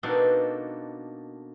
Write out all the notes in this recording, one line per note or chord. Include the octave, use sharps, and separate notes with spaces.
B2 A#3 C4 D4 D#4 A4